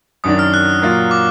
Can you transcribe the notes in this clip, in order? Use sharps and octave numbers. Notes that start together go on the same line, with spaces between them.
F#2 D#3 F#3 D4 D#6
F6
F#6
A#2 F#3 A#3 F4
D6